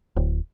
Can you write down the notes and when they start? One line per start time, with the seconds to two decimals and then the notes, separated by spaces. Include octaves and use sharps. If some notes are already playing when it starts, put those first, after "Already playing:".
0.16 D1